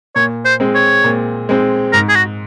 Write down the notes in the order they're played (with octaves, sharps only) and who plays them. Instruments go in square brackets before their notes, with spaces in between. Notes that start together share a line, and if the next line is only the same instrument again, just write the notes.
[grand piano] A#2 [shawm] C#5
[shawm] C5
[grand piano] G#3 C4
[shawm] C#5
[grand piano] A#2
G#3 C4
[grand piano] G#2 [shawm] A#4
[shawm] G#4
F#4